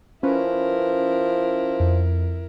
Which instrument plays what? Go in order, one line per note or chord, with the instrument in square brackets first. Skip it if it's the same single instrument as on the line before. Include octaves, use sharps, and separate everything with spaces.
[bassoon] F3 [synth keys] C#4 B4 [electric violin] E4 A#4
[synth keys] F2